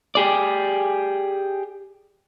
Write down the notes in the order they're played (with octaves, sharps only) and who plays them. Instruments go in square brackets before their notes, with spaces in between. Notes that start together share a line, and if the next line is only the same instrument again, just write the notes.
[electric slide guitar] G4 G#4 D5